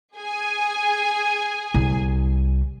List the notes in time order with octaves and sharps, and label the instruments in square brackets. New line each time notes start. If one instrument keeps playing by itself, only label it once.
[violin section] G#4 G#5
[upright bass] C2